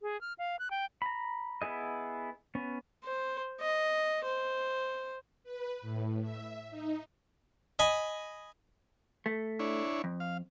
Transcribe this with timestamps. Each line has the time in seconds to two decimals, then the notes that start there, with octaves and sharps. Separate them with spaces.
0.02 G#4
0.21 F6
0.38 F5
0.59 F#6
0.71 G5
1.02 A#5 B5
1.62 B3 E4 G#4 D#5
2.55 B3 C#4
3.04 C5
3.61 D#5
4.24 C5
5.44 B4
5.81 A2
6.22 E5
6.70 D#4
7.79 D#5 G#5 B5
9.26 A3
9.60 D4 E4 C#5
10.04 F2
10.20 F5